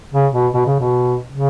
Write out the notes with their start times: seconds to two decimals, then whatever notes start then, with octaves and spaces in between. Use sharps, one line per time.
0.13 C#3
0.33 B2
0.54 B2
0.66 C#3
0.80 B2
1.33 C#3